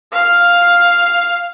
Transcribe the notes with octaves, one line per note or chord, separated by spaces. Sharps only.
F5